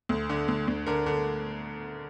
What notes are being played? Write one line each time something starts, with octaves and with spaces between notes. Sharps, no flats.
D2
D3
D2
D2
D3 A#4
D3